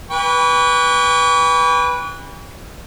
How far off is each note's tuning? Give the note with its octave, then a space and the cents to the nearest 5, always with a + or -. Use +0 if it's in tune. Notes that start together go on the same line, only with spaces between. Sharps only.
B4 -15 G5 +40 C#6 +40